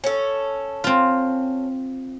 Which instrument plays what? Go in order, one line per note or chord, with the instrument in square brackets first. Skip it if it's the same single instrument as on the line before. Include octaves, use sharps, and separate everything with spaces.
[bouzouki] C#4 A4
[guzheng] C4 F4